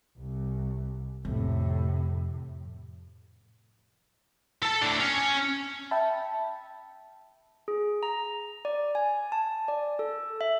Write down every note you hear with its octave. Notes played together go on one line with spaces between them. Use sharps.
C2
F2 A2 C3
A4 A5
A2 D4
C#4
E5 G5 A5 B5
G#4
A#5
D5
G#5
A5
D5
A4
E5